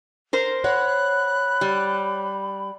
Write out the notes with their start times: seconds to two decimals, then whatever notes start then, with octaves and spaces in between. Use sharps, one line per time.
0.33 A#4 C5
0.64 C#5 F#5 B5 F#6
1.61 G3